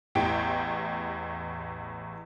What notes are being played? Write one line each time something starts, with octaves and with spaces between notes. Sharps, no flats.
A1 E2 A2 G4 G5